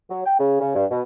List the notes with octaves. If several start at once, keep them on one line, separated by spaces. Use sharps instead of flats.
F#3
G5
C#3
C#3
G2
B2